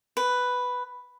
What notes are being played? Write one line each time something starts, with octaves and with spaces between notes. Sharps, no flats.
B4